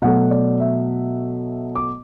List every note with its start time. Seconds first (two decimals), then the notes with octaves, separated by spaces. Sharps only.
0.02 B2 F#3 A3 F#5
0.31 D5
0.60 E5
1.75 D6